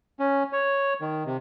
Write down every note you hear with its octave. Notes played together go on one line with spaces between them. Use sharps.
C#4
C#5
D#3
C3